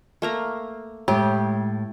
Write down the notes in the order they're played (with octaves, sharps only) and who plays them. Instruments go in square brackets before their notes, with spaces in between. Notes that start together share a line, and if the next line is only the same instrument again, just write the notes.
[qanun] A3 A#3 A#5
[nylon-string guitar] A2 [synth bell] G#3 [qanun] G4